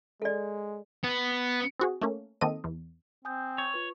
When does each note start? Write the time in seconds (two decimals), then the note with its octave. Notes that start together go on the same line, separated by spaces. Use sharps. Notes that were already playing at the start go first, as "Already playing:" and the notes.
0.22 G#3 A4 D5
1.03 B3
1.80 C4 F#4 G#4
2.02 A3 A#3 C#4
2.41 D#3 A#3 C4 A4 D#5 D#7
2.64 E2
3.25 C4 G#5 D#6 G6
3.58 C#5 C#6
3.74 F4 B4